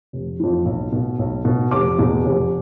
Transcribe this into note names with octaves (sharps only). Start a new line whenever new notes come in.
F1
F2 E3
B1
B2
B1
B2
F1 D6
E2 B2
F1